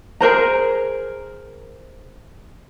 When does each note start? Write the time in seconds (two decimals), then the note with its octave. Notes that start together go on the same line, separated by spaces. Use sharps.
0.20 G#4 A#4 C5 A#5